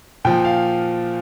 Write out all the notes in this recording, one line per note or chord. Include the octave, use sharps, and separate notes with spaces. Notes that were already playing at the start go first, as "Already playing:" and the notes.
A#2 F3 G5
F5